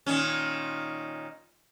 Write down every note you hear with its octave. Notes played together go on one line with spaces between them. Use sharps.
A#2 D#3 C#4